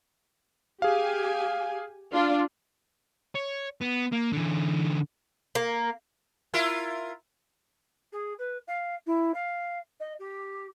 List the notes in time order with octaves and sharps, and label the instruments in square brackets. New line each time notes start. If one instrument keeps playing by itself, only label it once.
[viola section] G4 G#5 [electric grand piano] G#4 F5
[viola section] D4 F4
[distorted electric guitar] C#5
B3
A#3
D3 E3
[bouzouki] A#3
[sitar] E4 F4 A#4
[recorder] G#4
B4
F5
E4
F5
D#5
G4